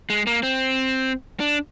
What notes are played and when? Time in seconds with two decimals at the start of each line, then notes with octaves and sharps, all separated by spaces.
0.10 G#3
0.27 A#3
0.43 C4
1.40 D4